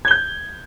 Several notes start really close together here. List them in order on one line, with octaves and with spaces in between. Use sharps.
G#6 G7 G6